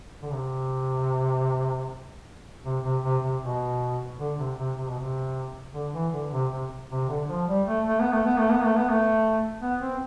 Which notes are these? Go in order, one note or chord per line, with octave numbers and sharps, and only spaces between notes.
D3
C3
C3
C3
C3
C3
B2
D3
C3
C3
C3
B2
C3
D3
E3
D3
C3
C3
C3
D3
F3
G3
A3
A3
B3
A3
B3
A3
B3
A3
B3
A3
B3
C4